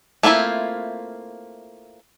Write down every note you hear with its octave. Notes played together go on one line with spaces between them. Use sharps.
A3 A#3 C4 E4 F4